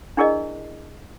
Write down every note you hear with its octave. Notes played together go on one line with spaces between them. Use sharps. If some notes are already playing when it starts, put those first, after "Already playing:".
D4 E4 G#4 A#4 D5 D#5